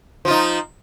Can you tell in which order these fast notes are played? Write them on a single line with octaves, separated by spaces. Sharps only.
F3 F4 D#4